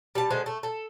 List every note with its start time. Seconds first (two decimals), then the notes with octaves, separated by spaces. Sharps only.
0.15 G3 A5
0.30 D3 G#3 D4 C5
0.46 A3
0.63 A4